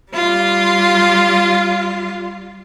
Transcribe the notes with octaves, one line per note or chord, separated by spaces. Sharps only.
G3 F4